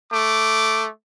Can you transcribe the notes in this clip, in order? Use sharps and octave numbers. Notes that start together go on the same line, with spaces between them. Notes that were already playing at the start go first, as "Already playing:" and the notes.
A3 D6